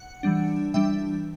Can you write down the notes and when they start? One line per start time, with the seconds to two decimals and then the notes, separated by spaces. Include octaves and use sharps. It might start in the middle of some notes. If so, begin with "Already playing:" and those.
Already playing: F#5
0.23 E3 G3 D4
0.74 E3 G3 D4 E5 G5